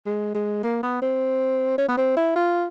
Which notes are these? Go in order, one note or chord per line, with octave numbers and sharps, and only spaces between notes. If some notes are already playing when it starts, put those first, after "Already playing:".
G#3
G#3
A#3
B3
C4
C#4
B3
C4
E4
F4